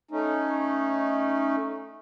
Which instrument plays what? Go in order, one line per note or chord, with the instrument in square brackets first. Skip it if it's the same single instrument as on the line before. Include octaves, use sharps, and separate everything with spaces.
[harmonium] A3 C#4 D#4